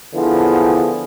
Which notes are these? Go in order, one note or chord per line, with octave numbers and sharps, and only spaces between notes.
D3 F3 B3 E4 G#4